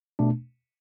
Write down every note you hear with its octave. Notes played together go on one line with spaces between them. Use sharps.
B2 A3 D4